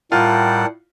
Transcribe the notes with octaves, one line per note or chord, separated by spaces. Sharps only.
A2 G3 F4 A#4 F#5 G5 A5